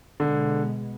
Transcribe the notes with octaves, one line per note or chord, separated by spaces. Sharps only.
B2 D3 G#3 B3